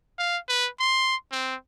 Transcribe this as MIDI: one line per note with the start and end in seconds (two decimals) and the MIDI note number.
0.19 0.38 77
0.48 0.69 71
0.80 1.16 84
1.32 1.55 60